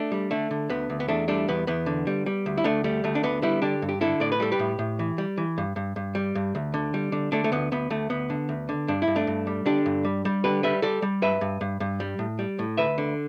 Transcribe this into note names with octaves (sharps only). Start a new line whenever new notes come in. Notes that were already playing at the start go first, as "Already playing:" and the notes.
Already playing: A3 D4
G3
D3 A3
D3
D2 B3
D2
B3
E2 A3 D4
G3 A3 D4
E2 B3
E2 B3
D3
G3
G3
D2
E4
D2 A3 D4
G3 A3
D2 A3
D4
D3 B3
G3 B3 E4
D3 D4 G4
G2
G4
D3 E4 A4
A2 D5
B4
G3 A4
G4 B4
A2
A2
E3
G3
E3
G2
G2
G2
G3
G2
D2
D3
G3
D3
D3 A3 D4
A3
D2 B3
D2 B3
D2 A3
D2 B3
D3
D2
D3
G2 D4
E4
G2
A3 D4
G2
G3
D3 D4 G4
G2
G3
G3
D3 G4 B4
G3 B4 E5
G3 A4 D5
G3
G2 B4 E5
G2
G2
G2
G3
A2
G3
A2
D2 B4 E5
D3